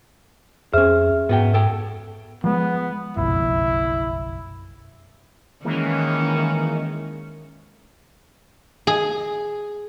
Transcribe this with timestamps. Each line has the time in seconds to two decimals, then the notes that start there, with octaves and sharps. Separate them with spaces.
0.73 F2 C#4 G#4 C5 E5 F6
1.29 G#2 B3 F#4 G5
1.54 A4 G5
2.44 F3 G#3 B3
3.17 F#1 B1 F2 E4
5.65 D#3 E3 G#3 A#3 C#4
8.87 G#4